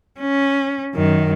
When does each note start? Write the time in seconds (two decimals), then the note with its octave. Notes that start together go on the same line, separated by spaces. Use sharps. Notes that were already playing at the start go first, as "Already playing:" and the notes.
0.20 C#4
0.94 F#2 D#3